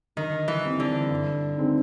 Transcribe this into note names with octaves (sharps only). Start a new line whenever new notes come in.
D3 D#3
E3
G3 C4 E4
D3
G2
D#3 G#3 C4 D#4